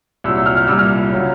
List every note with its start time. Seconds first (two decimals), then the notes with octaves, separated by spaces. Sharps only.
0.24 C2 A#2 F#3 E6
0.36 E6
0.46 F6
0.57 F6
0.68 C2 A#2 G3 E6
0.79 F6
1.12 C#3 F#3